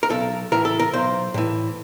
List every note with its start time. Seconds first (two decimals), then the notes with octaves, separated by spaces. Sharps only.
0.03 A#4
0.10 B1 A4
0.52 A2 E3 A#4
0.65 A4
0.79 A#4
0.93 B1 C5
1.34 A2 E3